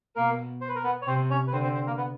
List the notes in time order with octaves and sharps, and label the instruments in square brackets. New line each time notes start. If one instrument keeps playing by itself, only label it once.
[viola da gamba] B2 [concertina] A#3 A#4
[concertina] C5
B4
A#4
B3 B4
C#5
[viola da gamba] C3 [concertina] C4 C5
[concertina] C#4 C#5
B4
[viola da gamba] D3 [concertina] C4 C5
[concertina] C4 C5
C4 C5
A#3 A#4
B3 B4